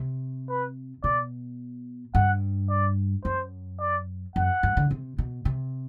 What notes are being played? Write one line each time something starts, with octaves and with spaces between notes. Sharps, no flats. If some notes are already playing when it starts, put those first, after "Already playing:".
Already playing: C3
B4
B2 D5
G2 F#5
D5
F#2 C5
D5
F#2 F#5
G2
D3
C3
B2
C3